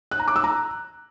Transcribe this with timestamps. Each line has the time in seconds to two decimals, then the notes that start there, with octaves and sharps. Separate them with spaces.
0.11 F#6
0.20 A#5
0.28 D6
0.36 E6
0.44 A#5